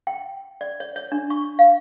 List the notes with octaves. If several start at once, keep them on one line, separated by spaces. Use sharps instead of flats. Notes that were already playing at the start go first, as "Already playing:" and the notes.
G5
D5
C#5
C#5
D4
C#6
F5